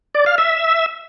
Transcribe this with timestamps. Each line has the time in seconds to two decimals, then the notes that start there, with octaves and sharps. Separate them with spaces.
0.15 D5
0.26 F5
0.38 E5